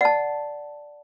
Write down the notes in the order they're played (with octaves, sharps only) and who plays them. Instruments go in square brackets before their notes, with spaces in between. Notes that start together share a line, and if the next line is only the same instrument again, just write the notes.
[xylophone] D5 [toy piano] F#5 A5